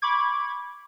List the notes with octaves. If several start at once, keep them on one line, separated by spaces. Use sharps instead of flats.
B5 C#6 D6 G#6